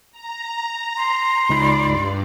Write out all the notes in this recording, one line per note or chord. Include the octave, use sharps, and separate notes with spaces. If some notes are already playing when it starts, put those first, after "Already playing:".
A#5
C6
C#2 D#4 D5 B5
G2